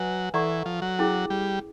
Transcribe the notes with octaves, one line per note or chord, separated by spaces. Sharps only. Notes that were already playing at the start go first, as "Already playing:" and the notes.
Already playing: F#3 B4 D#5 G#5
E3 A4 D5 F#5 A#5 C#6
F3
F#3
C#4 E4 G#4
G3